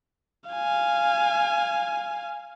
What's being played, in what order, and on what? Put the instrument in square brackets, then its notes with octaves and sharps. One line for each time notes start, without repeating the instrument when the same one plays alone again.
[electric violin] F5 G#5